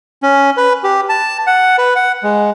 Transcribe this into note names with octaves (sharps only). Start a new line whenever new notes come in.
C#4
B4
G4
A5
F#5
B4
F#5
G#3